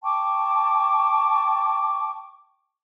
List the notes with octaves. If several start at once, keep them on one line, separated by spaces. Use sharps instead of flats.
G5 A5 C#6 D6